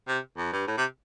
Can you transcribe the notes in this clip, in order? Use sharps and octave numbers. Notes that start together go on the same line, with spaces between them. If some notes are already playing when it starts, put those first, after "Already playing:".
C3
F2
G2
A2
C3